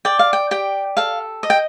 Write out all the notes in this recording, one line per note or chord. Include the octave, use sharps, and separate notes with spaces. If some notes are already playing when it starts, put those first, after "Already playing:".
D5 G5
F5
G5
G4 G5
A4 F5
D#5
G5